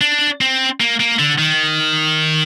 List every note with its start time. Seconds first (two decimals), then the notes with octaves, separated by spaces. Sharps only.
0.01 D4
0.41 C4
0.80 A#3
1.00 A#3
1.19 D3
1.38 D#3